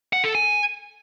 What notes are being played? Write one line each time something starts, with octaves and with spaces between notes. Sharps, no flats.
F#5
A4
G#5